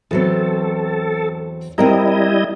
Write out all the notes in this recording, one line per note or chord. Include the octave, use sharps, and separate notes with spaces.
E2 F#3 C4 A4
G3 C4 E4 A#4 D#5 A#5